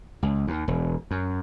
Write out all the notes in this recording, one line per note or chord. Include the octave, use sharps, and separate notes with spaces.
C#2
D#2
E1
F#2